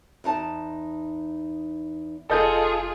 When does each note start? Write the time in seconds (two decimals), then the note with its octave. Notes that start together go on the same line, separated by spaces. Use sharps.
0.24 E2 D#4 A5
2.30 F1 F4 G#4 A4 D#5 G6